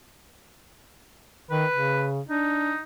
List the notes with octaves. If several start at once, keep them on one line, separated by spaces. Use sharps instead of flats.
D#3 B4
C#3
D4 D#4